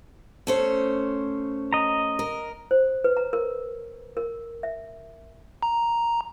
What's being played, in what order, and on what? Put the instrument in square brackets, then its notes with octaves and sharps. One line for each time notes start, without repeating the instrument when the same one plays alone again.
[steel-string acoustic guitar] A3 C#4 C5
[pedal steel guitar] D#5 A#5
[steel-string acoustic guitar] A#4
[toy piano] C5
B4
A#5
A#4
A#4
E5
[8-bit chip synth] A#5